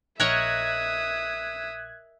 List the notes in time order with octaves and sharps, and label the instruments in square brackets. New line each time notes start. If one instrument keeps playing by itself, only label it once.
[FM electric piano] A#1 F#6 G#6 [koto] A#4 C#5 D#5 [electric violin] E5 D#6